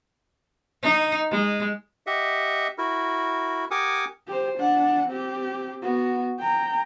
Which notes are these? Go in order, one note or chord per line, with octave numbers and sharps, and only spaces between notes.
D#4
G#3
G4 D#5 E5 F#5
E4 F#4 A#4
G4 A#4 F#5 G#5 D6 D#6
G4 C5
D4 F#5
C4 G4
B3 F#4
G5 A#5